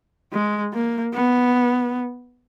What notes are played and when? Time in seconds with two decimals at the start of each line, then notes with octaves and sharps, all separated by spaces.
0.33 G#3
0.73 A#3
1.14 B3